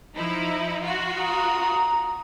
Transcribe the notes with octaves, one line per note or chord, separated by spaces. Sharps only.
F3 D#4 E4
F4 F#4
A#5 D#6